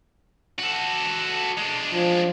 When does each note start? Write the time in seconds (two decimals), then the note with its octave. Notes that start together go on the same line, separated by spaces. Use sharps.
0.59 F#4 A4
1.58 G#3 D4
1.93 F3